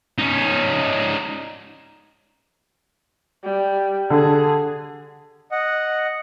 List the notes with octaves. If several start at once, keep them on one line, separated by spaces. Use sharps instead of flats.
C#4 D#4
G3
D3 G#4
D#5 F#5